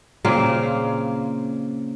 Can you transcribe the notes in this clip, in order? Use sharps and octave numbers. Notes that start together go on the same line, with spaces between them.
A#2 C#3 A#3 C4